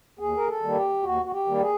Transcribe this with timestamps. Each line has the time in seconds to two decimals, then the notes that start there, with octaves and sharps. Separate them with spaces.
0.19 D#2 G#4
0.37 A#4
0.48 A4
0.62 D#3 G3 A#3
0.75 G4
1.03 D#2 F#4
1.25 F#4
1.32 G4
1.46 D#3 G3 A#3
1.61 G#4